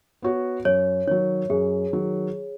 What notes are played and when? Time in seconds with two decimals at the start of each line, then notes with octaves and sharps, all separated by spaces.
0.22 B3 F#4 C#5
0.65 F#2 C#5
1.07 D#3 F#3 C#5
1.50 F#2 G#4
1.93 D#3 F#3